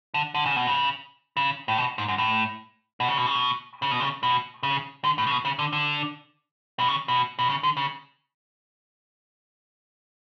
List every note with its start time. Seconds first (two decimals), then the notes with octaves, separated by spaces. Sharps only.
0.14 D3
0.34 D3
0.45 C#3
0.56 B2
0.67 C#3
1.37 C#3
1.68 A2
1.78 B2
1.98 G#2
2.08 F#2
2.18 A2
3.00 B2
3.09 C#3
3.18 B2
3.26 C#3
3.35 B2
3.82 C#3
3.91 B2
4.00 C#3
4.23 B2
4.63 C#3
5.04 D3
5.18 A2
5.27 C#3
5.31 B2
5.45 C#3
5.59 D3
5.73 D3
6.79 B2
6.88 C#3
7.08 B2
7.39 B2
7.50 C#3
7.63 D3
7.77 C#3